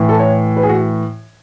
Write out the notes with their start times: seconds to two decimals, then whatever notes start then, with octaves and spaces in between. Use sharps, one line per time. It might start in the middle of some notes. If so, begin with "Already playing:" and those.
Already playing: A2 E3
0.09 A4
0.19 C#5
0.57 B4
0.63 G#4
0.69 F#4